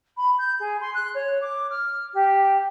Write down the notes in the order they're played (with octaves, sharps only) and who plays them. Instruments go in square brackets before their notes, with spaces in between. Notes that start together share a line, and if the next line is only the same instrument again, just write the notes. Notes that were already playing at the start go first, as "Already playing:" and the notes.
[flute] B5
G6
G#4
C6
F#6
C#5
D6
F6
G4